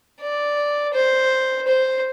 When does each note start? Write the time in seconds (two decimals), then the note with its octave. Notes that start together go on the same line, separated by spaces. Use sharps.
0.21 D5
0.94 C5
1.67 C5